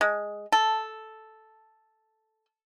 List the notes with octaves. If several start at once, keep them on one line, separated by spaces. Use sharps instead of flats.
G#3
A4